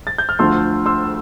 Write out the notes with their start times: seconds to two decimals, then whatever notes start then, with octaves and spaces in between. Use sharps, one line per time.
0.07 A6
0.18 G6
0.29 F6
0.39 D2 D3 F3 A3 C6 E6
0.86 C6 E6